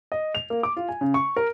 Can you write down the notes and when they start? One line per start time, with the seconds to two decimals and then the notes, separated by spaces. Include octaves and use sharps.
0.12 D#5
0.35 F7
0.50 A#3
0.63 D6
0.77 F4
0.89 G#5
1.01 C#3
1.14 C#6
1.36 A#4